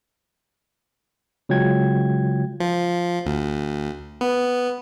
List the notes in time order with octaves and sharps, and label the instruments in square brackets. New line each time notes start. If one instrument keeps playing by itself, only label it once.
[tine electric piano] C#3 F#3 G#3 F4 G5 G#6
[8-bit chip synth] F3
D2
B3